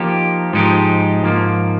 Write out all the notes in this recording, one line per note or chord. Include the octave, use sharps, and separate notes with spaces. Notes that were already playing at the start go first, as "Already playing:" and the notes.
Already playing: F3 A#3 D#4 G4
G#2 F3 G#3 D#4 G4
G#2 F3 A#3